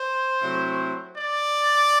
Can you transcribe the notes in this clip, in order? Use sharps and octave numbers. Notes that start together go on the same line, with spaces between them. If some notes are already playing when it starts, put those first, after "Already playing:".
Already playing: C5
C3 F#3 A3 C4 E4
D5